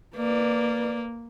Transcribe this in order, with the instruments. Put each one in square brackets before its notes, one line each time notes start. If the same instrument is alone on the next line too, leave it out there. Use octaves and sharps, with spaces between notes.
[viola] A#3 [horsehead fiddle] B4 D5